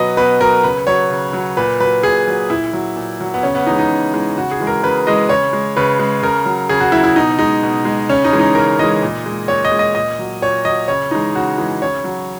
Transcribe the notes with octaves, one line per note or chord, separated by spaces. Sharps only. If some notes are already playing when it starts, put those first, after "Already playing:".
Already playing: B2 F#3 B4 D#5
B2 B4
F#3 A#4
C#3 B4
F#3 C#5
C#3
F#3
A#2 B4
F#3 B4
A#2 G#4
F#3
A#2 E4
F#3
A#2
F#3
B3
C#3 C#4
B3
E3 G#3 D#4
D#4
C#3
E3 G#3
C#3 F#4
G#4
E3 G#3
A#4
C#3 B4
E3 G#3 D#5
C#3 C#5
G#3
C#3 B4
G#3
C#3 A#4
F#3
C#3 G#4
F#4
F#3 E4
E4
B2 D#4
G#3 D#4
B2
G#3
C#3 C#4
D#4
E3 G#3
D#4
C#3 A#4
E3 G#3 D#5
A#2
G#3
A#2 C#5
D#5
G#3
D#5
A#2 D#5
F#3
A#2 C#5
F#3 D#5
C#3 C#5
E3 G#3 D#4
C#3 F#4
E3 G#3
C#3 C#5
F#3